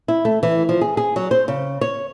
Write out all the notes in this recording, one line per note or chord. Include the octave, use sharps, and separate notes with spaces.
E4
A3
E3
F3
G#4
G#4
F#3
C5
C#3
C#5